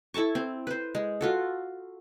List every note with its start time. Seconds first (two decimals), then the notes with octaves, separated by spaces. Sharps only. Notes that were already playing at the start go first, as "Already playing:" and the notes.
0.14 E4 A4 A5 C#6
0.35 C4
0.67 B4 C5
0.95 G#3
1.21 F4 F#4 A4